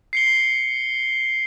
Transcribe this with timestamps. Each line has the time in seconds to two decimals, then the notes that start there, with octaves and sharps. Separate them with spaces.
0.13 C7 C#7 G7